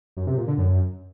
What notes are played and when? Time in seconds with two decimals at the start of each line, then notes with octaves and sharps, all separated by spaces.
0.17 F#2
0.27 C3
0.37 A#2
0.48 D3
0.58 F#2